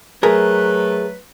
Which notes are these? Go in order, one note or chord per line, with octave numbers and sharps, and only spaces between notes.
F#3 A3 G#4 A#4 B4